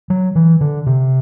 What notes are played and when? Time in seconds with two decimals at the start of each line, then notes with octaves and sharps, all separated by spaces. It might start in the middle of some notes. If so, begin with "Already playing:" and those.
0.10 F#3
0.35 E3
0.61 D3
0.86 C3